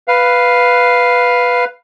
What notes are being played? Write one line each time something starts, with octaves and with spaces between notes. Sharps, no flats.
B4 F5